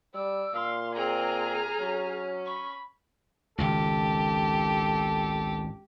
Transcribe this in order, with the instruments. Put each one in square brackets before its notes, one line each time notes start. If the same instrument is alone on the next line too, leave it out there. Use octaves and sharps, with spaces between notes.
[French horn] G3 [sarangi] D5 [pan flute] E6
[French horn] A#2 [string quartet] F5 C6
[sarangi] C4 [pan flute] G#4 [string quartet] G#5 A#5 F6
[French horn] F#3 [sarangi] C#4
[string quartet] B5 [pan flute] C#6
[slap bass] G#1 C#2 [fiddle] G4 [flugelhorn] A4